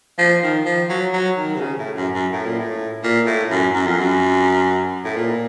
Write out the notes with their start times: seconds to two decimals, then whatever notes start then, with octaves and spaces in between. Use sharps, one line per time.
0.18 F3
0.43 D#3
0.65 F3
0.89 F#3
1.13 F#3
1.37 D#3
1.55 C3
1.60 C#3
1.78 A2
1.96 F#2
2.14 F#2
2.32 A2
2.45 A#2
2.59 A2
3.03 A#2
3.26 A2
3.51 F#2
3.73 F#2
3.86 F2
3.99 F#2
5.05 A2
5.16 A#2